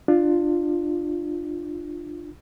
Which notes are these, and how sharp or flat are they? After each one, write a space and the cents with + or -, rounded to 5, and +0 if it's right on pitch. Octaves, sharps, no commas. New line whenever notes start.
D4 +30 F4 +0